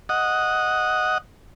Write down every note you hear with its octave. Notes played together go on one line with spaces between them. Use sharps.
D#5 F#5